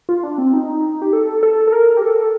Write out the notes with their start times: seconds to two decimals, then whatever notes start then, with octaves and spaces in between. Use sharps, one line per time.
0.09 F4
0.23 D4
0.38 C4
0.54 D#4
1.02 G4
1.13 A4
1.43 A4
1.67 A4
1.72 A#4
1.97 G4
2.02 A4